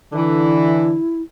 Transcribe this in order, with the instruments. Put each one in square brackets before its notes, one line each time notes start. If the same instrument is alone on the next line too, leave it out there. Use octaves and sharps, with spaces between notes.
[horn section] D3 E3 [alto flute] E4